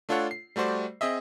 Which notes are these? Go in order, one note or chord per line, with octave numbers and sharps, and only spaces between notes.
A3 D4 F4 A4 C#5 F#5
C7
G3 A3 F#4 C5 D5
C4 G#4 D#5 E5